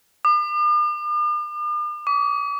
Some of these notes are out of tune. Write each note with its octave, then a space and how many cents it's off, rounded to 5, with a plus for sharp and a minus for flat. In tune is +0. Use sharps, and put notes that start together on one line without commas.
D6 +45
D6 -40